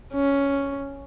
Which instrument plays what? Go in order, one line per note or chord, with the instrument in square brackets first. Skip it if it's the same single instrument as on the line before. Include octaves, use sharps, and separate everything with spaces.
[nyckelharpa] C#4